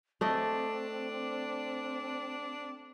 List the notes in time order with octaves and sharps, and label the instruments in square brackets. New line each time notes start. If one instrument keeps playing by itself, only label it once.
[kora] A3 D#5 [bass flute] C4 [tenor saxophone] D4